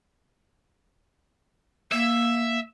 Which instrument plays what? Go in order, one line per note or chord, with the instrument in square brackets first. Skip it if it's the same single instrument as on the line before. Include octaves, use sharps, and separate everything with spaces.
[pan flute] A#3 [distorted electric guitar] E5